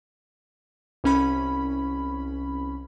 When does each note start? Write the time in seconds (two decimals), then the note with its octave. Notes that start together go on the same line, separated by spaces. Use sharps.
1.04 C2 C#4 B5